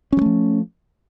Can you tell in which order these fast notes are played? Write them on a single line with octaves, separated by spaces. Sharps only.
C#4 F#3 A3 F3